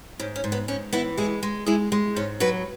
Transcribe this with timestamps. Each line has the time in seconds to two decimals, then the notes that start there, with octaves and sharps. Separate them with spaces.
0.19 G#2 C#4
0.36 C#4
0.44 G#2
0.52 B3
0.68 G#2 C#4
0.93 E3 B3 E4
1.17 G#3 E4 G#4
1.43 G#3
1.66 G#3 E4 G#4
1.92 G#3
2.16 G#2 C#4
2.40 F#3 F#4 B4